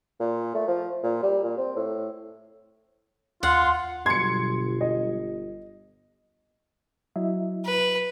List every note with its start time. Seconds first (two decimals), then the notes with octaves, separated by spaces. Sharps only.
0.20 A#2
0.55 A3
0.68 F3
1.03 A#2
1.23 G3
1.43 A#2
1.58 C4
1.76 A2
3.43 D#2 F4 F#5 C6
4.06 G1 B2 F#3 G3 C6 G#6 C#7
4.81 D#5
7.16 F#3 E4 D#5 E5
7.65 B4